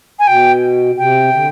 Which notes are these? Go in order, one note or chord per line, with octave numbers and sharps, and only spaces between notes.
G#5
B2 G5
C3 G5
D3